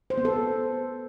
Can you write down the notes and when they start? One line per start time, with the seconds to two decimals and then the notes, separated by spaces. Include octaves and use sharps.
0.10 C5
0.18 B3
0.25 A4